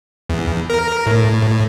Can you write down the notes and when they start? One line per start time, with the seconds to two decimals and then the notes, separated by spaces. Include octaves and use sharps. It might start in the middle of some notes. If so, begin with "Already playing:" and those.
0.30 E2
0.70 A#4
1.06 A2